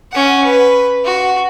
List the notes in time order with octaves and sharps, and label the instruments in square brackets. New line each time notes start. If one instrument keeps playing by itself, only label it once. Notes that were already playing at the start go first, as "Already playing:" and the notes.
[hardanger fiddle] C#4 F#5
B4
F#4